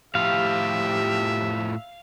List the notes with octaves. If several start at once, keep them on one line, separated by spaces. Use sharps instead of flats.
A2 F3 G4 E5 F5